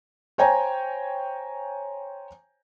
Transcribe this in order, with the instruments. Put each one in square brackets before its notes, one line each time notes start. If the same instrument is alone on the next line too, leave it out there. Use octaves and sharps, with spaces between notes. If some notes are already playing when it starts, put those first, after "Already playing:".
[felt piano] C5 C#5 G5 G#5 A#5